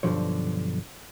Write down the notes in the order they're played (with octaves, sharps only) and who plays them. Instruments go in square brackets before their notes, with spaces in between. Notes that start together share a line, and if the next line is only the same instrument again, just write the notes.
[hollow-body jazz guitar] B1 G2 B2 D3 F3 C#5